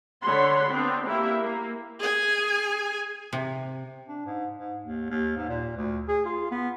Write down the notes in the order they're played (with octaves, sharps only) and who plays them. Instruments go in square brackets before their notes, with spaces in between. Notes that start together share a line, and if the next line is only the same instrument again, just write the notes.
[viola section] D3 C#5 F#5 B5 C6
B3 C4 D4
A#3 E4 G4 A#4 E5
A#3
[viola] G#4 G#5
[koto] C3
[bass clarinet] D4
G#2
G#2
D#2
D#2
G#2
A#2
D2
G#4
F4
B3